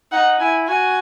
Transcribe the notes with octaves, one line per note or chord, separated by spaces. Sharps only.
D#4 F#5
E4 G#5
F#4 G#5